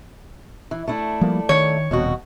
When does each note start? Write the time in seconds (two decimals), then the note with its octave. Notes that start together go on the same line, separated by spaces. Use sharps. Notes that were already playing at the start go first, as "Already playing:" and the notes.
0.71 E3
0.88 A3 D4 E4
1.21 F3 G3 A#3
1.49 D#3 C#5
1.91 D#1 F2 B2 F#4